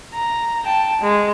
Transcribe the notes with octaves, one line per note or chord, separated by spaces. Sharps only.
A#5
G5 A5
G#3